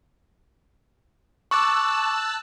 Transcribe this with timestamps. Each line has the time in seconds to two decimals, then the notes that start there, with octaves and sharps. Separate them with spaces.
1.51 A5 C#6 D6 E6 F#6